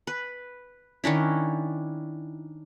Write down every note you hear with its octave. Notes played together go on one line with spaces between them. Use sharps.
B4
D#3 C#4 D4 E4